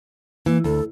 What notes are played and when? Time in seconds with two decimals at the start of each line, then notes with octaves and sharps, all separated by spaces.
0.46 E3 A#3
0.64 D2 A4